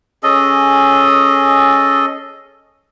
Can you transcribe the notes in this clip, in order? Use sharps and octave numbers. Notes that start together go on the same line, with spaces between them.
C#4 G#4 A4 D#5